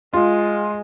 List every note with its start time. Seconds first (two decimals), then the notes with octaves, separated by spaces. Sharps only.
0.13 G#3 F4